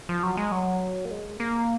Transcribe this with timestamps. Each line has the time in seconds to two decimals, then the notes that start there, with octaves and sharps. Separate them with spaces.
0.09 F3
0.23 F#3
0.37 G#3
0.52 F#3
1.05 A#3
1.11 G#3
1.40 A#3